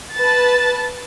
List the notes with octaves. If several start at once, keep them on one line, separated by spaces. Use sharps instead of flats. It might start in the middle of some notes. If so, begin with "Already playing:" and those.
B4 A5 A6